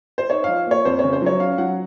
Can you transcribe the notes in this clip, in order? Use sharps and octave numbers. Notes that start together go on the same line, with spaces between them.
C5
D#4 C#5
F3 F5
A#3 C#5
F2 C5
C#3 C#5
C5
F#3 C#5
C#4 F5
F#3 F#5